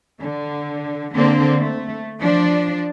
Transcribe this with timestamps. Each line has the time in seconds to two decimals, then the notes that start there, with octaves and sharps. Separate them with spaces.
0.21 D3
1.14 D3 A#3 C4 D4
1.58 A3
2.19 F3 D4